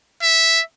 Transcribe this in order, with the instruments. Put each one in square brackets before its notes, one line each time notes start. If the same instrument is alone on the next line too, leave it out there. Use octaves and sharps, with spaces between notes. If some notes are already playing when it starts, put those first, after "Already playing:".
[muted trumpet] E5